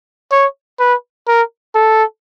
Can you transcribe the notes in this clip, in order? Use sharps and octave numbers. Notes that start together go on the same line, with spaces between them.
C#5
B4
A#4
A4